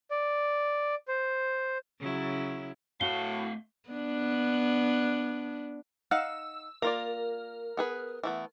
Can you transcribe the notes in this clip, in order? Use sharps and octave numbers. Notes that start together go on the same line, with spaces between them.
D5
C5
C#3 F#3 E4
A2 A3 F#4 F5 G7
B3 D4
D#4 F5 F#5 E6
A#3 F4 A#4 D5
B3 G#4 B4
E3 A3 B3